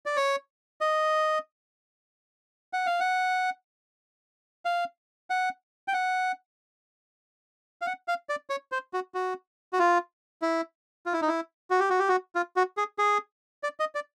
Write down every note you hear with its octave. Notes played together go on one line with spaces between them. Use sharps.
D5
C#5
D#5
F#5
F5
F#5
F5
F#5
G5
F#5
F5
F#5
F5
D5
C#5
C5
F#4
F#4
F#4
F4
E4
F4
E4
D#4
E4
F#4
G4
F#4
G4
F#4
F4
F#4
G#4
G#4
D5
D#5
D5